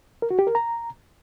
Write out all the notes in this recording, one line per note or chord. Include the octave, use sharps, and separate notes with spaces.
A#4
F#4
G4
A#4
A#5